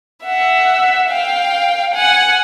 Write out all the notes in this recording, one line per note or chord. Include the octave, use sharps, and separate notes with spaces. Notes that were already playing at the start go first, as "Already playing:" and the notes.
E5 F#5
F5 G5
F#5 G#5